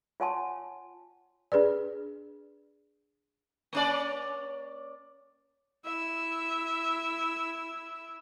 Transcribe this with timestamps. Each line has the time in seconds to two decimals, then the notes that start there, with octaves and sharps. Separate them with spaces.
0.20 F4 C#5 F#5 G#5 A5 C6
1.52 D4 G#4 B4 D5
3.73 A#3 C#4 D5
5.85 E4 E5